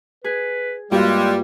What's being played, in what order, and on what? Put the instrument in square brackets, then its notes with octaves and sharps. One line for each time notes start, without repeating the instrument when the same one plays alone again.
[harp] G#4 [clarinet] B4
[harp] G2 F#4 [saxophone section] G3 [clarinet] G#3 [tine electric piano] A#3 F4